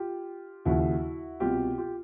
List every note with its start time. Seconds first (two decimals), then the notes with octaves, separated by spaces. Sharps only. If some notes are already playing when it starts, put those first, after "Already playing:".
Already playing: F4 G4
0.65 D#2 C#3 F3 E4 F#4
1.40 C2 B2 F4 G4
1.78 F4 G4